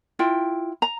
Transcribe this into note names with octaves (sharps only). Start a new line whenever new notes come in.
E4 F4 G5
A#5